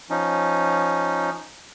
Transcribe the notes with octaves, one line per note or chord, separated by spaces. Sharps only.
F3 C#4 D#4